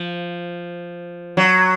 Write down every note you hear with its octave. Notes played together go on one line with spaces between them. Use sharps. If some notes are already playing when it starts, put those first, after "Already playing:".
Already playing: F3
F#3